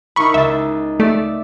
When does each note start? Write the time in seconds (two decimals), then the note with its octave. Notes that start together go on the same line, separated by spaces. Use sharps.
0.16 D#4 E4 A#4 B5 C#6
0.34 C#2 E5 A6
1.00 A3 D5 E5